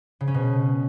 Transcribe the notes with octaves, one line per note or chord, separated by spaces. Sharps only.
C#3
C#4
B2